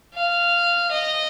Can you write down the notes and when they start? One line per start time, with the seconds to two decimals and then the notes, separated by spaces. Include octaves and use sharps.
0.14 F5
0.91 D#5